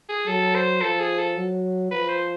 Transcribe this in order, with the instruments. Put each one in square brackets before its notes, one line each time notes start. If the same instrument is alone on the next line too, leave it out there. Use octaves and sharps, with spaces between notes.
[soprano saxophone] G#4
[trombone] F#3 [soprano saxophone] A4
[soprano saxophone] C5
[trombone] F3 [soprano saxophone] A4
[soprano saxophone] G#4
A4
[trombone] F#3
[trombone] F3 [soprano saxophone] B4
[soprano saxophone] C5